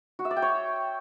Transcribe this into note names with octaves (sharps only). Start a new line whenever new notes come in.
F#4
E5
D5
G5
C#5